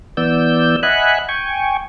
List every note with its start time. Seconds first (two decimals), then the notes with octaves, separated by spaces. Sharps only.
0.17 E3 B3 D5 E6 G6
0.83 D#5 E5 F#5 G#5 B5 F#6
1.29 G5 G#5 C#6